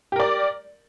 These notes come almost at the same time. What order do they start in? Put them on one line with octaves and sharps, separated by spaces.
G4 A#4 D5